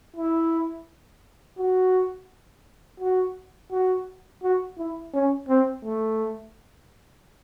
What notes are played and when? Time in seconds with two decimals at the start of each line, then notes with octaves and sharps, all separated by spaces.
0.16 E4
1.59 F#4
3.00 F#4
3.71 F#4
4.43 F#4
4.78 E4
5.14 C#4
5.49 C4
5.84 A3